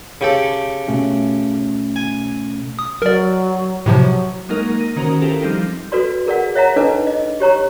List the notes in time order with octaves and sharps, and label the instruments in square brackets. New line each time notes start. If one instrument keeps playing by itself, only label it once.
[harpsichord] C#3 G4 A4
[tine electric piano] B2 A3 C#4
[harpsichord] G#5
[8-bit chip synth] D#6
[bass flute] F#3 [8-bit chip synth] A#4 D5
[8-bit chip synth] A2 C3 F3 [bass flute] F#3
[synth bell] F#3 G#3 A#3 D#4 A#4
A#6 D#7
D#3 C#4 F#4 A#4 C5
E4 F4 G4 A4 A#4
F3 G3 C4 D#4 G4
[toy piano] F#4 A4 B4 D5 C6
G#4 A#4 D5 F#5
C#5 E5 F#5 A#5
D4 D#4 A4 B4 D#5 D6
D#5
G4 C#5 A#5 C#6